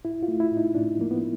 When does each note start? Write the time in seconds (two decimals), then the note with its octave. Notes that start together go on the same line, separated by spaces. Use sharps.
0.04 A2 E4
0.23 F4
0.28 A3
0.40 E4
0.52 A2
0.57 D#4
0.75 A2 D4
0.98 F3 A#3
1.11 B3